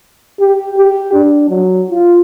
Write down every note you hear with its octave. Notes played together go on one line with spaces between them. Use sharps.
G4
G4
D4
F#3
F4